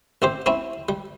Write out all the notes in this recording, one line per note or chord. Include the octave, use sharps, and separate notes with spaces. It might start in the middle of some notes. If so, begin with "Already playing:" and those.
A1 C4 G4 C5
C4 C#4 E4
G3